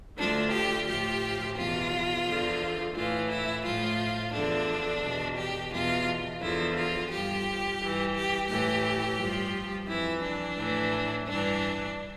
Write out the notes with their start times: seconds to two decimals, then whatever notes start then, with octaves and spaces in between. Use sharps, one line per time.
0.17 D2 D3 F3 D4
0.52 G4
0.86 A2 F3 G4
1.56 E2 B2 F4
2.25 E2 D3 F3
2.94 A2 E3 F4
3.29 E4
3.64 A2 F3 F4
4.33 E2 D3 F3 D4
5.02 E2 B2
5.37 G4
5.72 E2 B2 F4
6.40 E2 D3 F3 E4
6.75 F4
7.10 G2 F3 G4
7.79 G2 E3
8.14 G4
8.48 A2 E3 G4
9.18 G2 F3
9.87 F2 E3 E4
10.22 D4
10.56 A2 E3
11.26 G2 E3 D4